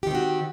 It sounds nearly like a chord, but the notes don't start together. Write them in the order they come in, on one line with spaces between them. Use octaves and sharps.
G4 D#3 C4 F#4